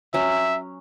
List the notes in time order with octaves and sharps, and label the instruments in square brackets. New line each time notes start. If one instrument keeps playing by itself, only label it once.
[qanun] F#3 C#4 [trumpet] E5